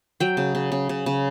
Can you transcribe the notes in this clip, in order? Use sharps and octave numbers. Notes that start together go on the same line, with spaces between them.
F#3 G5
C#3
C#3
C#3
C#3
C#3